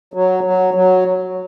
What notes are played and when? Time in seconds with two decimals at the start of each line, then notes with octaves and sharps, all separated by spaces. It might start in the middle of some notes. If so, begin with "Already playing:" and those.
0.14 F#3
0.44 F#3
0.74 F#3